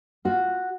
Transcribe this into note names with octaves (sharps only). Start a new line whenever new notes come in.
F4 F#4